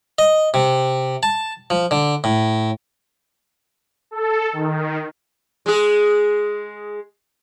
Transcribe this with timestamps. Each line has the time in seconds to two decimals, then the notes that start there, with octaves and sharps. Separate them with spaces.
0.19 D#5
0.54 C3
1.23 A5
1.70 F3
1.91 D3
2.24 A2
4.11 A4
4.53 D#3
5.66 G#3 G#4